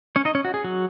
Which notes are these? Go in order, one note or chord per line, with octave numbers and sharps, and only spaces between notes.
C#4 C#5
D#4 D#5
C#4 C#5
F#4
G#4
F#3 F#4